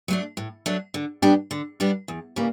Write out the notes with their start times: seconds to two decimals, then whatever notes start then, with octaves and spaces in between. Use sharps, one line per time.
0.08 F#3 A3 D4
0.37 A2
0.66 F#3 A3 D4
0.94 D3
1.22 G3 B3 D4 G4
1.51 D3
1.80 G3 B3 D4 G4
2.08 E2
2.36 C#3 E3 G3 A#3